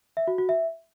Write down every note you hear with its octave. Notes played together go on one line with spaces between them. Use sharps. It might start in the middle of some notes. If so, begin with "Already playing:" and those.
E5
F#4
F#4
E5